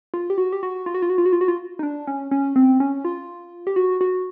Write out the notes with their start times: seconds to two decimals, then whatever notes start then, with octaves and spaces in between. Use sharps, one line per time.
0.14 F4
0.30 G4
0.38 F#4
0.52 G4
0.63 F#4
0.86 F4
0.94 F#4
1.02 F4
1.10 F#4
1.18 F4
1.26 F#4
1.33 F4
1.41 F#4
1.48 F4
1.79 D#4
1.83 D4
2.07 C#4
2.31 C#4
2.56 C4
2.80 C#4
3.05 F4
3.67 G4
3.76 F#4
4.01 F#4